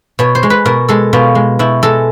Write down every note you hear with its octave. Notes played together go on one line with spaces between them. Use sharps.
B2 C#5
C5
G#3
B4
B2 A#4
G#3 A4
B2 F4
G#3
B2 E4
G#3 A4